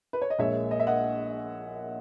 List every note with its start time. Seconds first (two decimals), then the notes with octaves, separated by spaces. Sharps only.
0.13 B4
0.22 C#5
0.30 D#5
0.39 A#1 A#2 G#3 C#5 E5
0.71 D#5
0.80 E5
0.87 D#5 F#5